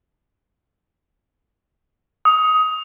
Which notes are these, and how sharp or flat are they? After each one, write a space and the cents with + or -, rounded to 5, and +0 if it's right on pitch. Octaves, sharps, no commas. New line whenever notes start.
D#6 +20